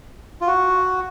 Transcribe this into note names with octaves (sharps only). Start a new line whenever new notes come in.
F4
F#4